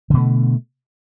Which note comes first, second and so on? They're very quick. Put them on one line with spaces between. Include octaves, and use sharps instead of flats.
D3 B2 A3